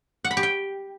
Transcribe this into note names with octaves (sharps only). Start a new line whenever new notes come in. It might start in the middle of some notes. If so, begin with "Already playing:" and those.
F#5
B5
G4
G5